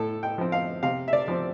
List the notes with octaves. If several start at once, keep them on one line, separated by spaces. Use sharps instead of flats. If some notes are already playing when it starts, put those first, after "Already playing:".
Already playing: A2 A4
G5
F3 C4
F5
C3 F5
E5
D5
F3 C4